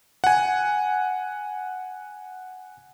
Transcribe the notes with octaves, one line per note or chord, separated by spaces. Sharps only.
F#5 G#5